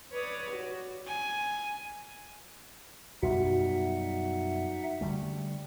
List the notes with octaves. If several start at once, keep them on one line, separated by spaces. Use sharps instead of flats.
B4 C#5 D5 D#6
F#4
G#5
F#2 B2 G3 D#4 F#4 E5 F#5
D3 G3 A3